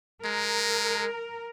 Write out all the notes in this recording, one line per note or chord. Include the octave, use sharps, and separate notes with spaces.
G#3 A#4